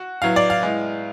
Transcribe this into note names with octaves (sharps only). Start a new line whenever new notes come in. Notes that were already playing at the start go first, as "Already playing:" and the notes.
Already playing: F#4
A2 F#3 B3 F5
D5
F5
A2 G#3 B3